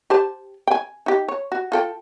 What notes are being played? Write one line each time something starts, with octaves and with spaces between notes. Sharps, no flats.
G4 C5 A5
G5 G#5
D#4 G4
C#5
F#4
F4 A4 G5